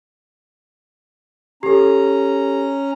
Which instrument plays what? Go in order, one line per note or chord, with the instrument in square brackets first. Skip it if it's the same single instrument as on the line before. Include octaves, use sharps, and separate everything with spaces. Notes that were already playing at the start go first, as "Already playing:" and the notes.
[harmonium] C#4 A#5 [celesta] G4 A4